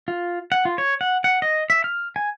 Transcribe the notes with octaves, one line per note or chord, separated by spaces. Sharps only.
F4
F#5
F4
C#5
F#5
F#5
D#5
E5
F6
G#5